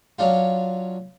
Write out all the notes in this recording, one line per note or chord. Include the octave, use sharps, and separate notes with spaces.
F#3 C#4 D4 F4